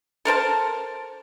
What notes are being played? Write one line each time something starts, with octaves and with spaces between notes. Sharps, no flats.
A4 A#4 C5 A5